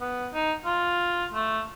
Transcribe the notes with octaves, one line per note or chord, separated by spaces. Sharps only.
B3
D#4
F4
A3